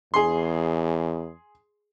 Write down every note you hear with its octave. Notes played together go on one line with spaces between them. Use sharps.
E2 G#4 C6